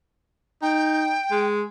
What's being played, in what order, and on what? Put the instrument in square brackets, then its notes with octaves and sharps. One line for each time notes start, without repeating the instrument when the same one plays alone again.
[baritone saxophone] D#4 [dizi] G5
[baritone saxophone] G#3